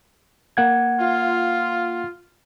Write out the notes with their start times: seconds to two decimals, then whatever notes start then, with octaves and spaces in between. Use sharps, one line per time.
0.57 A#3 F#5 G#6
1.00 F4